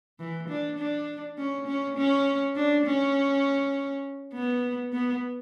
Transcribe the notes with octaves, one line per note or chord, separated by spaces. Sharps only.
E3
D4
D4
C#4
C#4
C#4
D4
C#4
B3
B3